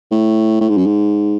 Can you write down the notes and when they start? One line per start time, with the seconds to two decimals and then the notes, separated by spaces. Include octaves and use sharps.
0.11 A2
0.60 A2
0.69 G#2
0.77 F#2
0.86 G#2